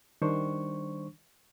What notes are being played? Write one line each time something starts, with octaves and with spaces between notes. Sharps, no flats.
D#3 G3 D4 C5 C#6